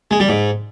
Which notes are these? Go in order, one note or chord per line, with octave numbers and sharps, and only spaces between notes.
G#3
G3
G#2